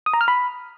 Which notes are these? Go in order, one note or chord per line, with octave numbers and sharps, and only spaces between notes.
D#6
A#5
F6
B5